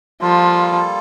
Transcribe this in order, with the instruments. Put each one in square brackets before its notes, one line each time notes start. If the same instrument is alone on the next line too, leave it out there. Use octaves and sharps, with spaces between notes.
[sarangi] F3 [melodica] G3 A#3 F4 A4